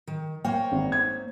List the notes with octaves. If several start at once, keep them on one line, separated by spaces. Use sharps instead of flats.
D#3
A#3 C5 C#5 G5
G#1
G#6